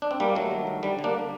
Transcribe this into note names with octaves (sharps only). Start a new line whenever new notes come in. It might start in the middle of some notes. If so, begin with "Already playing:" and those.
D4
C4
G2 G3 A#3
D#3 F#3 A3
D#3
G2
D3 G3
D3
A#3 D4